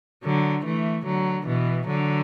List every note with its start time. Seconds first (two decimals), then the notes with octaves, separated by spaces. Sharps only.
0.24 D3 F#3
0.65 E3 A3
1.06 D3 F#3
1.47 B2 E3
1.88 D3 F#3